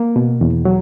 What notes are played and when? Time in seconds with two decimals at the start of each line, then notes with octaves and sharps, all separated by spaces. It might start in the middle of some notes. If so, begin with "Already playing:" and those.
Already playing: A#3
0.16 B2
0.41 E2
0.65 F#3